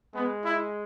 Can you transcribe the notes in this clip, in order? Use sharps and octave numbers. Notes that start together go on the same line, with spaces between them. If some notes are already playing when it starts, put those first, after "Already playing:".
G#3 B3
E4